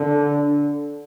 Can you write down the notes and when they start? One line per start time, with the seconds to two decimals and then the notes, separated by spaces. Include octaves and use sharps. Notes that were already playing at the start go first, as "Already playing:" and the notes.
Already playing: D3